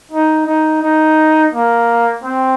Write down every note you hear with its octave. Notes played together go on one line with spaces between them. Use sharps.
D#4
D#4
D#4
A#3
C4